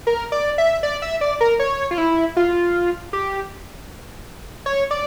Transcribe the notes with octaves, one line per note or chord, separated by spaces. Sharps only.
A#4
D5
E5
D5
E5
D5
A#4
C#5
F4
E4
F4
G4
C#5
D5